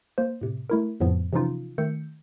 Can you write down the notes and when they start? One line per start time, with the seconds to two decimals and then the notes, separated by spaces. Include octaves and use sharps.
0.18 A#3 C5
0.41 A2 C3
0.70 A3 E4 A#4
1.00 F2 A2 C#3 F3 B3
1.33 C3 E3 F3 C#4 D#4 F4
1.78 D#3 A3 E6 G6 C#7